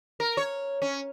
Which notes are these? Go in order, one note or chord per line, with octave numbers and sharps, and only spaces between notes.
A#4
C#5
C#4